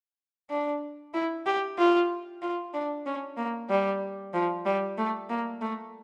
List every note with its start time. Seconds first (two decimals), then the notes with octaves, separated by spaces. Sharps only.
0.50 D4
1.14 E4
1.46 G4
1.78 F4
2.42 F4
2.74 D4
3.06 C#4
3.37 A#3
3.69 G3
4.33 F3
4.66 G3
4.98 A3
5.30 A#3
5.61 A3